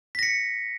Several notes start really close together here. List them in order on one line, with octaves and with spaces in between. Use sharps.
B6 A#6 C#7